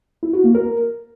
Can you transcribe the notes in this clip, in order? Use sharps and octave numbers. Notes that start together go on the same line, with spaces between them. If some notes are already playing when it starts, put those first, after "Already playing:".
E4
F#4
A#3
A#4